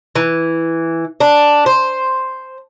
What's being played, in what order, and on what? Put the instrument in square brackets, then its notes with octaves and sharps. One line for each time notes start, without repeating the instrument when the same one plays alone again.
[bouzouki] E3
D4
C5